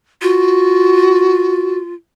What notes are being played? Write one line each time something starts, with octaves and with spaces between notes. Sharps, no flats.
F4 F#4